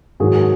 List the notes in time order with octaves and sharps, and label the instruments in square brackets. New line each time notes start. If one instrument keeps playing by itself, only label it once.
[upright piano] G#2 D#3 F#3 F#4 G#4